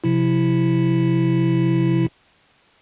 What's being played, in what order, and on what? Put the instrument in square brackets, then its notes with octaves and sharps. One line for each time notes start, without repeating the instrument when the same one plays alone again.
[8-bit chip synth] C3 F3 E4